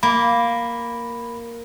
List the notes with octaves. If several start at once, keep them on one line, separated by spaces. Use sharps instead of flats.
A#3 B5